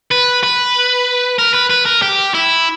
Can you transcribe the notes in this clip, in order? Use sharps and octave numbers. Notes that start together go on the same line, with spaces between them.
B4
B4
A#4
B4
B4
A#4
G4
E4